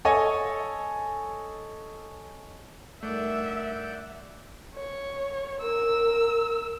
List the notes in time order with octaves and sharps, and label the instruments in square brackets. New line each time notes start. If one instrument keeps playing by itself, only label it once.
[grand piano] A4 C#5 D#5 G#5
[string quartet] G2 D#3 [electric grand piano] A3 [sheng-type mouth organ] D5 F#5 G6 [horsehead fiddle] E5
[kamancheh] C#5
A#4 E6